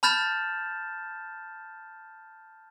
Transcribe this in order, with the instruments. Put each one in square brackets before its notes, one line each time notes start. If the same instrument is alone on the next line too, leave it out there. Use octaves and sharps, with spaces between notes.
[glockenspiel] A5 B5 F6 G6 A6 E7